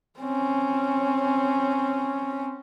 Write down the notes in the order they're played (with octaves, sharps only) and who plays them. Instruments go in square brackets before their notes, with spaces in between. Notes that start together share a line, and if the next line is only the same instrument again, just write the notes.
[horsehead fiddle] C4 C#4